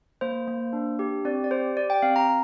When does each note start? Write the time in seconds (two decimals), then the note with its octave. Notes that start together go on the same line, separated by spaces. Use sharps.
0.21 A#3 C5
0.47 A#3
0.73 D4
0.99 G4
1.25 C4 D5
1.44 D5
1.51 G4 C5
1.77 G4 D5
1.90 G5
2.02 C4 F5
2.16 A#5